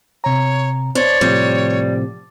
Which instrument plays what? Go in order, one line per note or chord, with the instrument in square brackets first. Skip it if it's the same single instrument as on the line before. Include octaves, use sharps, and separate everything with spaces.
[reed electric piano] C3 A#5 [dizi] C#5
[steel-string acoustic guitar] D4 [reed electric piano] C5 [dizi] C#5
[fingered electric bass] A2 C3 F3 [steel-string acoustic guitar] G3